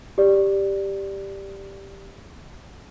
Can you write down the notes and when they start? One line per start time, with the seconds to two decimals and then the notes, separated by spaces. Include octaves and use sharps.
0.18 G4 D5